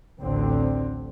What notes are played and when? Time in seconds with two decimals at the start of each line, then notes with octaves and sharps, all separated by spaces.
0.21 A1 D2 D3 C4